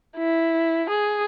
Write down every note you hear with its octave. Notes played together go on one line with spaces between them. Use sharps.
E4
G#4